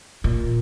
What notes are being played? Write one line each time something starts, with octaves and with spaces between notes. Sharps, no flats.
A#2